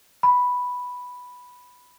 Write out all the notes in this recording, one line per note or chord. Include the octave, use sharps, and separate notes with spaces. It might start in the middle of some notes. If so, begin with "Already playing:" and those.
B5